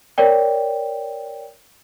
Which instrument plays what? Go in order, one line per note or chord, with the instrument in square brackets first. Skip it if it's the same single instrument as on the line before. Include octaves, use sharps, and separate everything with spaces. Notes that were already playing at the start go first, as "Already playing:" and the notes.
[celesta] A#4 C#5 D5 G5